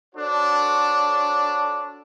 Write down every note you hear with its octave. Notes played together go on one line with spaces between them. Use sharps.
D4 F#4 A4 C5 C#5